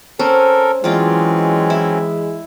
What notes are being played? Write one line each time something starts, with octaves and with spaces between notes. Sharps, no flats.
C4 C#4 A4 A#4
E3 F#3 G#3 C4 C#4 F4 D5
E4